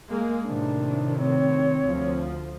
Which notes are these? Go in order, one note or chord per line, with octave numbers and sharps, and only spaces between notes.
G#3 A#3
A2 C3 D#3 D4
C4 C#5
D2 F3